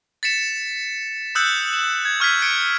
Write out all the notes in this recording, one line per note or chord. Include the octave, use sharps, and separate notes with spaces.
A6 B6 C#7 E7
D#6 E6 F#6 G6 C#7 F#7
E7
G#6
C#6 F6 G#6 B6
G#6 C#7 D7 G7